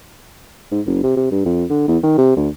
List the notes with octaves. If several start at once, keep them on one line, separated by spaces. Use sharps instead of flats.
G#2
F#1
C3
C3
G2
F2
D3
E2
D#3
C3
D2